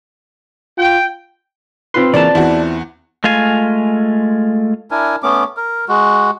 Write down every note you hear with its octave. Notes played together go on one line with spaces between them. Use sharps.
F4 G5
C4 F4 B4 C6
C#3 E3 A#3 D5 A5
E2 E4 F#4
G#3 A3 F4 F5 G#5
D4 E4 A#4 G#5
A3 B3 C#4 D6
A#4
G#3 F#4